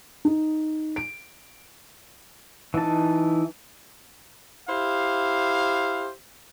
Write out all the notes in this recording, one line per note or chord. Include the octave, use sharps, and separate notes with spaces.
D#4
D7
E3 D#4 A5
E4 G4 C5 F5